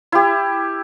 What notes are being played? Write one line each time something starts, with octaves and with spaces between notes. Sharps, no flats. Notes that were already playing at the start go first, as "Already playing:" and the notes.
E4 G4